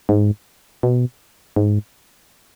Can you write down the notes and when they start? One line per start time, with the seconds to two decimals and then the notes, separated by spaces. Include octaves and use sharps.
0.09 G#2
0.83 B2
1.56 G#2